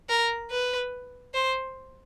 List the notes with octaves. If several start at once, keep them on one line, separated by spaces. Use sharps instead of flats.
A#4
B4
C5